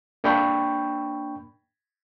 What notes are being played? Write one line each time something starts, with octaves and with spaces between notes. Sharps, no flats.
A#3 D4 G5 B5 C#6 G6